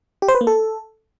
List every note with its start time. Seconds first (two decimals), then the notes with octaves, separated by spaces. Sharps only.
0.22 G4
0.28 C5
0.35 B4
0.41 A#3
0.47 A4